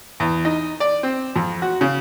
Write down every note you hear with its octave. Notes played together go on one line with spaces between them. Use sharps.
E2
D#4
D5
C4
F2
F#4
C#3